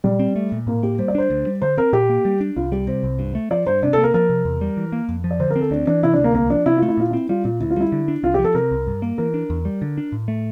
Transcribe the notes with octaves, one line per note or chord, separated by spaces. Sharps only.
A#2 G3
C4
A3
A#2
A2 A#3
A#3 G4
G3 C5
D5
D4 C5
D2
G3
D3 C5
C4 A#4
A#2 G4
A#3
G3
D4
C2 F4
G3 G4
C3 C5
C2
G2
A3
F3 D5
G2 C5
C3 D4
A4
A#3
A#4
F3 A#4
C3
E2
G3
E3
A#3
F2
F3
D5
D3 C5
A#4
C4
A4
D2 D4
E3 D4
C3 E4
D4
D2 A#3
C2 A#3
F3 D4
C3 E4
F4
A3
E4
A#2 F4
C4 E4
G3 F4
A#2 F4
D2 E4
F4
G3 E4
D3
D4
C2 F4
G4
F3
A4
C3 A#4
C2
G2
A#3
E3 A#4
D4
E2
G3
D3
D4
A2
A3